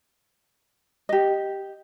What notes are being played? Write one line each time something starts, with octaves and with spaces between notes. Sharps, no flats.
G4 D#5